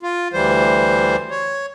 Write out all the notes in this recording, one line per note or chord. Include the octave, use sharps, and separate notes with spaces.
F4
D2 E3 G3 C5
C#5